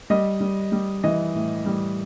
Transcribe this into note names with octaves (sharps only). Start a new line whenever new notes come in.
G3 D#5
G3
G3
E3 D#5
A2
G3